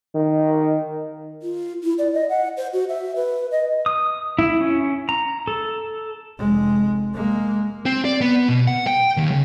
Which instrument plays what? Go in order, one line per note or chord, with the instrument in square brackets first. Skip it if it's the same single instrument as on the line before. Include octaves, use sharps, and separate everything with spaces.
[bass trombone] D#3
[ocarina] F4
E4
D5
D#5
F#5
C5
F#4
E5
B4
D#5
[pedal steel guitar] D#6
E4
C#4
A#5
A4
[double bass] F1 G#3
G#3 A#3
[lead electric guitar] C4
D5
B3
B2
F#5
G5
D#2
C#3